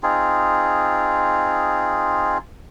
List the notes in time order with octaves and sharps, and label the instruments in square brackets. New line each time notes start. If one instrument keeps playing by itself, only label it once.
[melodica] C4 D#4 F4 G#4